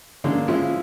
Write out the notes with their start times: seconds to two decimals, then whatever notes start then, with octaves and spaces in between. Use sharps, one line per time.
0.24 D3 G#3 A#3 C#4
0.48 F3 G#3 C#4 E4 F4